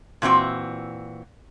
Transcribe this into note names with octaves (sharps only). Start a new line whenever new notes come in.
A#2 E3 C4 F#4